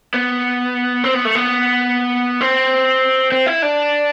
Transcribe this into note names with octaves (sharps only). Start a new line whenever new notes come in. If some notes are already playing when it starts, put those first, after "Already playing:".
B3
C4
B3
A3
B3
C4
C4
E4
D4